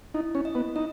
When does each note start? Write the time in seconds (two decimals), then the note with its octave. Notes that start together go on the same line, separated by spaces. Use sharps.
0.14 D#4 E4
0.35 C#4
0.45 D#5
0.55 B3
0.76 D#4 D#5